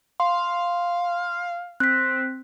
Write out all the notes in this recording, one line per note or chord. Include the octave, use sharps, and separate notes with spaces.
F5 C6
C4 F#6 B6